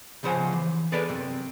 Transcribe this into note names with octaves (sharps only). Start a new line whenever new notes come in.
C#2 C#3 F3 C5 F#5 G#5
E3
G#4 A4 B4 D5
F#2 C3